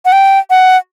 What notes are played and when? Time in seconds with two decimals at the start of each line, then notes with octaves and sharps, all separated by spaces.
0.05 F#5
0.12 G5
0.50 F#5